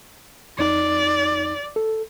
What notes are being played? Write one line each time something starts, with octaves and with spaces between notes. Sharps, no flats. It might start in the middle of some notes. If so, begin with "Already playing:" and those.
F2 D#4 D5
A4